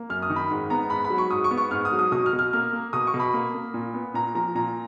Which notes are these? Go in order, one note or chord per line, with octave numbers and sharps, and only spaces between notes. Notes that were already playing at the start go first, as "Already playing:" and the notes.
Already playing: A#3
F#2 F6
D#6
D#3
B5
G#2
B3 A#5
G#2 B5
B5
F#3
C#6
G#2 D#6
C#6
B3
C#6
G#2 F6
D#6
F#3
D#6
B2 D#6
F6
B2
F6
A#3 F6
A#3
B2 D#6
C#6
B2
B5
A#3
A#3
A#2
B3
A#2 A#5
F3 A#5
A#2 A#5